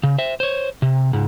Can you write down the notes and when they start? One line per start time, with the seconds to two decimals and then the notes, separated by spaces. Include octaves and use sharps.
0.03 C#3
0.18 C5 E5
0.40 C5 C#5
0.82 C3
1.13 C#2 G#2